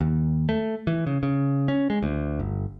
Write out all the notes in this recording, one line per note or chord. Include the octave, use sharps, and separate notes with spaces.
D#2
A3
E3
C#3
C#3
C#4
G#3
D2
G1